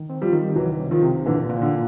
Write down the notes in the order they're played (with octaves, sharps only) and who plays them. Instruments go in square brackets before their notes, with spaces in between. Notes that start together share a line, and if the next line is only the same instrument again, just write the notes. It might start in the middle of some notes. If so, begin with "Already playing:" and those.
Already playing: [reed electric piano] D#3
C4
[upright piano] F3 G3
[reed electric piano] D#3
[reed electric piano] C2 [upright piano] E3 F#3
[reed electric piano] C3
[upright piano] D#3 F3
[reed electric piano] C3
[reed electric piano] A#2 [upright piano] D3 E3
[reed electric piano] A#2
[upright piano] D3